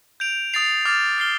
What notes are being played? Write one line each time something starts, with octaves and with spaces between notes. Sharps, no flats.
G6 D7 F7
D#6 A6 C7 F7
D6 F6 A6
F6 C7 G7